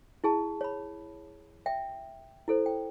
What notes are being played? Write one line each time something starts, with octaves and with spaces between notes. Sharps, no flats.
E4 G#4 A5
C#5 B5
E5 G5
E4 A4 C5
G5